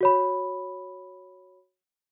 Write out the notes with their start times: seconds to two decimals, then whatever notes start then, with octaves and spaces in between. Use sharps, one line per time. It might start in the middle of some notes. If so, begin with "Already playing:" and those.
0.01 F#4 C#5 B5